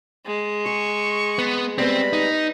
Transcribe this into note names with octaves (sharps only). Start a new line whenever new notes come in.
G#3
G#4 C#6
B3
G3 G#3 B3 C4 B5
D#4